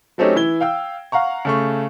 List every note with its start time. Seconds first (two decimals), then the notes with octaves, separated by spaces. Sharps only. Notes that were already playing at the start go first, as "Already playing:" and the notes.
0.18 F#3 A3 C4 C#4 D#4 G4
0.35 E3 E4 G#6 G7
0.61 F5 G5 E6
1.12 F5 F#5 A#5 C#6
1.45 C#3 A3 C#6